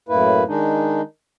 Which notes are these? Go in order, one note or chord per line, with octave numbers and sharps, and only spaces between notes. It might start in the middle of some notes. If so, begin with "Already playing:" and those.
F#2 A2 A#3 E4 B4
D#3 G#3 D4 D#4